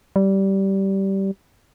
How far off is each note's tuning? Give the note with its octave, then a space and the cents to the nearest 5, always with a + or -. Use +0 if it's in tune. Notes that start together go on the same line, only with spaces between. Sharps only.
G3 -15